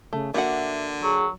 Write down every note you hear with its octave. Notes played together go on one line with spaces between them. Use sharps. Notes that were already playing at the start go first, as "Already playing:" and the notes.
C#3 A3
D3 A#3 F#4 E5 F#5
F#3 G#4